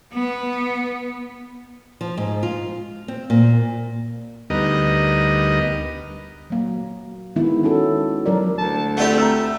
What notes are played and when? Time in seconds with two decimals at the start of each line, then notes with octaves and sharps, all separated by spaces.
0.13 B3
2.01 F3
2.17 G#2
2.43 F4
3.08 C4
3.30 A#2
4.50 D2 G3 B3 D#4 A#4 D#5
6.50 F#3 A#3
7.36 D#3 G#3 B3 E4
7.63 C#4 F#4 A4
8.26 F#3 A#4 D5
8.58 D2 A5
8.97 A3 C4 E4 F4 G4 D5 F#5
9.18 A#5 E6